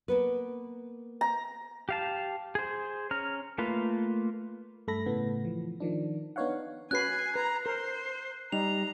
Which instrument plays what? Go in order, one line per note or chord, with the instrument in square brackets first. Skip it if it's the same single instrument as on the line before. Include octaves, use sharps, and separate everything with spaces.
[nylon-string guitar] A#3 B3 B4
[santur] A#5
[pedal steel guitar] G4 F5 A5
G#4 C5
C#4 A#5 F6
A3 A#3 F4 B4
[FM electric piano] G2 A3 A4 B5 A#6
A2 C#3 B3
E3 F3
D#3 F3 D4
B3 D4 D#4 C#5 F5 F#5
[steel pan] C#4 F#4 B4 [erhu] G#5 [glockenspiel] F#6 C7
[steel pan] B4 [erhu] A#5
[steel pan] A#4 [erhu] C5
[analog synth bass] G3 [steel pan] D#4 [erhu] A#5 [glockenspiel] F7